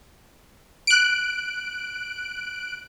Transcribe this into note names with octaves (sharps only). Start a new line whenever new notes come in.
F#6 D7